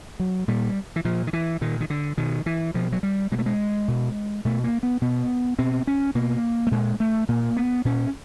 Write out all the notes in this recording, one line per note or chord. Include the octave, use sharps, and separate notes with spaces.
F#3
A#2 G3
E3
A#2 F3
D#3
E3
A#2 D#3
D#3
D3
B2 D#3
E3
B2 F3
F#3
G3
B2 G#3
A3
G#3
B2
B2 A3
A#3
B3
B2 B3
B2 C4
C#4
B2 A#3
A3
A#2 G#3
A3
A#2 A#3
B3
A#2 C#4